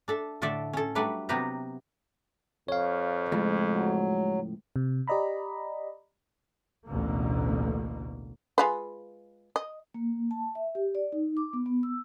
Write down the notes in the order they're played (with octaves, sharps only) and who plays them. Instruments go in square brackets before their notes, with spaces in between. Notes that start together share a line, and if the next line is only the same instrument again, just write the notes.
[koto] D4 A4 E5
A2 D3 A3 A4 D5 E5
C#4 A4
F#3 G3 A3 D4 B4
C3 F#3 B3 G4 B4 A#5
[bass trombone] F2 [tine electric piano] C#5 F5
[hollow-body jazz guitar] C#2 A2 F3 [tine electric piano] G#3
[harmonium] F#3
[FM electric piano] C3
G4 D5 D#5 A#5 B5
[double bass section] A1 D2 B2 A#3
[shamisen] G#3 F4 B4
D#5
[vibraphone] A#3
A5
E5
G4
D5
D#4
D6
B3
B3
E6